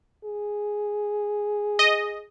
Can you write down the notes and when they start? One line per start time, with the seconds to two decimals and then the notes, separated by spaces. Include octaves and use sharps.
0.24 G#4
1.79 D#5